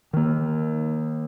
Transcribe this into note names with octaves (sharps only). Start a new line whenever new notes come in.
D#3 A#3